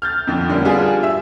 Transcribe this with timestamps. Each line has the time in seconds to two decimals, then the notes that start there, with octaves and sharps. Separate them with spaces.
0.02 F6 G6 A6
0.27 F2 D3
0.49 D3 G3 A#3 C#4
0.65 G3 B3 D4 F4 F#4 G#4
1.03 E5 E6